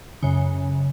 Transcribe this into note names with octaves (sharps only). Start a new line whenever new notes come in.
F#2 C#3